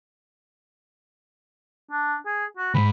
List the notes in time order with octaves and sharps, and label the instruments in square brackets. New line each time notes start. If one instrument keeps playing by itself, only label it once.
[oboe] D4
G#4
F#4
[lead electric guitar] D2 G#2 [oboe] B5